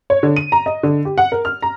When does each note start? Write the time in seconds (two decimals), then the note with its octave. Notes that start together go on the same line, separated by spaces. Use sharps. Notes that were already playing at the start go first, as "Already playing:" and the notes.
0.10 C#5
0.23 D3
0.36 D#7
0.52 A#5
0.66 D#5
0.83 D3
1.05 G4
1.18 F#5
1.32 A#4
1.45 F6
1.62 A#5